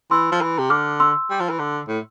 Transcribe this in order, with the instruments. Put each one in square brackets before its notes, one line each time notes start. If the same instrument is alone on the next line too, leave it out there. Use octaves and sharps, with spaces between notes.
[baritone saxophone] E3 [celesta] C6 E6
[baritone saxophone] F3
E3
C3
[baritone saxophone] D3 [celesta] D6 F6
[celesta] C6 E6
[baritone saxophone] G3
F3
E3
D3
A2